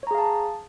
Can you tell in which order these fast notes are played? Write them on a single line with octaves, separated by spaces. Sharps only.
C#5 A#5 G#4 F5 A5